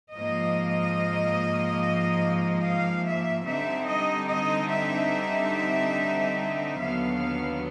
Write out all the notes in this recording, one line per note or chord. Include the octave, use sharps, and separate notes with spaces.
G#2 F3 A#3 D#5
F5
E5
D3 G3 C4 D#4 E5
D#5
D#5
E5
D#2 D3 F#3 B3 F5